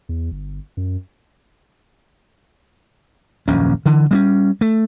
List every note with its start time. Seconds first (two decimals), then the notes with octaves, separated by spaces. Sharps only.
0.09 E2
0.32 G1
0.77 F#2
3.48 D#1 A#1 F#2 C#4
3.85 D3 E3
4.11 G3 A#3 C#4
4.61 A3